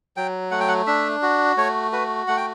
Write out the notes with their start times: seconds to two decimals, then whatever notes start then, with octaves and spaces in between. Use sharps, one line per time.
0.17 F#3 G5
0.51 A3 F#5
0.60 G5
0.68 F#5
0.87 D4 E5
1.22 F#4
1.57 A3 C#5
1.92 F#4 B4
2.27 A3 F#5
2.37 G5